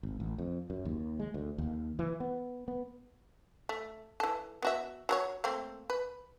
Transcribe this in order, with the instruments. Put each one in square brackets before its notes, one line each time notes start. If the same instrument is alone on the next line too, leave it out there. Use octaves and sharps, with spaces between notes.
[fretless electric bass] G#1
A1
F2
F#2
D#2
G#3
D2
D#2
E3
B3
B3
[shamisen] A3
E3 A4
B3 F#4 E5
F#3 A#4 C#5
A3 A#3 C4
B4